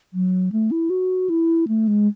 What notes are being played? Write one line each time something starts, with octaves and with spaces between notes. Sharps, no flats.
F#3
A3
E4
F#4
E4
A3
G#3